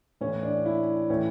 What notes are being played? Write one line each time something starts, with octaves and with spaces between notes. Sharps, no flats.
A2 E3 C#4
D4
E4
A2 E3 C#4